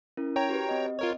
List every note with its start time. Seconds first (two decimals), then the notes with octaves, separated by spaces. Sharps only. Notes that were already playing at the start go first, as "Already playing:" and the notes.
0.17 C#4 E4 A#4
0.36 C#5 G5 A#5
0.49 F#4 G4 B4
0.69 C4 D#5
0.99 F4 A#4 C#5